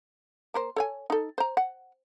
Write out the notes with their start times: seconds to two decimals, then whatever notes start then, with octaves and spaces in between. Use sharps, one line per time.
0.54 A#3 A#4 C5
0.76 A4 C#5 G#5
1.10 D#4 A4
1.38 C5 A#5
1.57 F#5